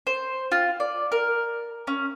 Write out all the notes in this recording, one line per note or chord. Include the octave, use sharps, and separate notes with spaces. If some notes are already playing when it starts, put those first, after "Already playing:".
C5
F4
D5
A#4
C#4